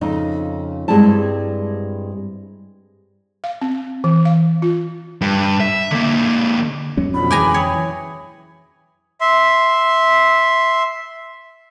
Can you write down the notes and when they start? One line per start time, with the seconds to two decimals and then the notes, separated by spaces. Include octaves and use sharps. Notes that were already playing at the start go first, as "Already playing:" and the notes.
0.01 F2 C#3 D#4
0.88 G2 G3 G#3 C4 E4 A5
3.44 F5
3.61 C4
4.04 E3
4.25 F5
4.62 F4
5.21 G2
5.60 E5
5.91 D3 A#3
6.97 F2 F#3 C#4
7.14 B2 D3 F3 B5
7.31 E3 G#4 G5 G#5 A#5 D6
7.54 C#5 G5 D#6
7.74 E3
9.21 E5 C6